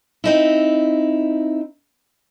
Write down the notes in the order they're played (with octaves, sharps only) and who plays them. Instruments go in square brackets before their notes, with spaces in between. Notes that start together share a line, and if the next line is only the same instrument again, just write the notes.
[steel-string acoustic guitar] C4 D#4 E4